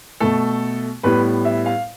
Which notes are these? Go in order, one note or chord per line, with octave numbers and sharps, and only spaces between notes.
B2 A3 A4
A2 G3 B3 B4
E5
F5